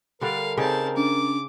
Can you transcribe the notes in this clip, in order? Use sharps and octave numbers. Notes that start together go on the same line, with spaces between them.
D3 G3 D4 A#4 F5
C#3 C4 D#4 G4 A5
C#4 D4 D6